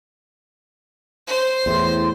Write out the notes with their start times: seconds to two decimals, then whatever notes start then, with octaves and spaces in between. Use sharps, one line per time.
1.27 C5
1.66 E2 A2 C6